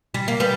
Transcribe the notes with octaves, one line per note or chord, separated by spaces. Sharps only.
G3
A#3
G3 B3